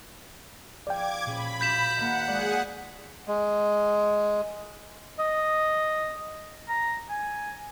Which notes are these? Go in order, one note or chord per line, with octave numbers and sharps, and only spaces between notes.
F3 G#4 D5 G5 D6 G#6
A#2 C#4 G#4 C5 B5
F#2 F5 C6 G6 B6 E7
D#3 A#3 F#5
F3 G#3 G#4 D5 F#5
G#3
D#5
A#5
G#5